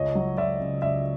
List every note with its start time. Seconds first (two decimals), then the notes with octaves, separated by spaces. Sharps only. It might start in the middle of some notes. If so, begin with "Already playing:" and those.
Already playing: C#2 C#5 D#5
0.15 F#3
0.37 C#2 D5 E5
0.60 C#3
0.82 C#2 D5 E5